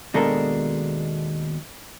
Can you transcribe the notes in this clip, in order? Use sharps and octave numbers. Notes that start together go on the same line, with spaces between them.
D#2 B2 G#3 D4 A4 A#4